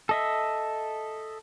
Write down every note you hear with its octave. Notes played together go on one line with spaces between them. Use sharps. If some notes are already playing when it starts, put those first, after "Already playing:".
A4 D#5 E5